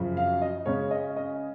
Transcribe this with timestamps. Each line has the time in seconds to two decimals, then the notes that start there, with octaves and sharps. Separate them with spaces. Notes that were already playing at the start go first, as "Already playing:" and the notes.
Already playing: F#2 C#3 F3
0.17 F5
0.42 D#5
0.66 C#3 G#3 C#4 C#5
0.91 D#5
1.16 D#5